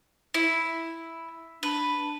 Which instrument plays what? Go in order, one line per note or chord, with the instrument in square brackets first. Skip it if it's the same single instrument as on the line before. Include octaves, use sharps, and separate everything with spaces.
[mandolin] E4
[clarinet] D4 [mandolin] B4